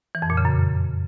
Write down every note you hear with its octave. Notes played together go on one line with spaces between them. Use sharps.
E3
F2
A#2
C#3
F#2